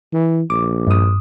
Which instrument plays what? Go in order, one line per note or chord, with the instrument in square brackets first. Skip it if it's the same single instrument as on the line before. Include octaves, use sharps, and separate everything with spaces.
[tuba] E3
[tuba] A#1 [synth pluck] D6
[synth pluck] G2 D#6